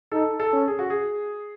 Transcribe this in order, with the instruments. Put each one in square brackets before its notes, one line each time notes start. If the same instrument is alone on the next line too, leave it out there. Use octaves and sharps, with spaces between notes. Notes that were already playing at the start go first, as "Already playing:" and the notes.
[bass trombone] D#4 [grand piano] A4
[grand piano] A4
[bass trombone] C#4
[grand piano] G#4
F#4
G#4